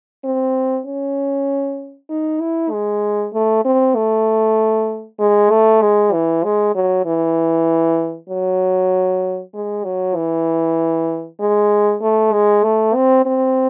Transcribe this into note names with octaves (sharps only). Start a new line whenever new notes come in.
C4
C#4
D#4
E4
G#3
A3
C4
A3
G#3
A3
G#3
E3
G#3
F#3
E3
F#3
G#3
F#3
E3
G#3
A3
G#3
A3
C4
C4